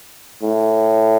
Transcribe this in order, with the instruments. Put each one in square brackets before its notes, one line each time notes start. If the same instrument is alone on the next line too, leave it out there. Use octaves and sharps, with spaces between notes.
[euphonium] A2